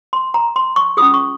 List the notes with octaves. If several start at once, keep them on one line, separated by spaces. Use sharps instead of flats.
C6
A#5
C6
C#6
C#4 F4 G#4 D#6
C#6